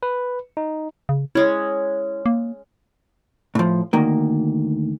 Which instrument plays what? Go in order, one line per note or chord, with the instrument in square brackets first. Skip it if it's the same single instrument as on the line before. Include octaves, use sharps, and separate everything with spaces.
[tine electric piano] B4
D#4
[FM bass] C#3
[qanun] G#3 C#4 [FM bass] E4
[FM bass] A#3
[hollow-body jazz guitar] A2 F3
D2 D#3 A#3